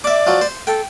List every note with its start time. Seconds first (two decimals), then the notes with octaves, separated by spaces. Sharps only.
0.04 D5 E5 D6
0.27 F3 F#3
0.41 C5
0.67 A4 G5